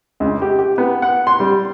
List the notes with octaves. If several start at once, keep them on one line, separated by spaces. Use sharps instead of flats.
C#2
G4
G4
B3
F#5
C6
G3